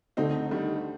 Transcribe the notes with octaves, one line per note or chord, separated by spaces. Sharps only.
D2 D3 A3 C4 D#4
D#3 G3